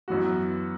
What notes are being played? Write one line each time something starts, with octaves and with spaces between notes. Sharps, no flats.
F#2 E3 B3 F#4